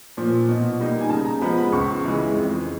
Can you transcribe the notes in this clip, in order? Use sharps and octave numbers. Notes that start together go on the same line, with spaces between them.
A#2 F3
B2
G3 A#3 D#4
G#5
C#3 A5
A#5
F3 G#3 B3 B5
B5
C#2 C#6
C#3 E3 G#3
F2